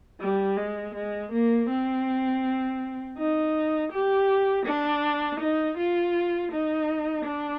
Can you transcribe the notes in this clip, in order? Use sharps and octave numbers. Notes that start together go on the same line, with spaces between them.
G3
G#3
G#3
A#3
C4
D#4
G4
D4
D#4
F4
D#4
D4